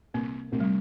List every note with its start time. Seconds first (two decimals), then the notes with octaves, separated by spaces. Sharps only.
0.14 C2 A#3
0.52 C2 A3
0.60 G3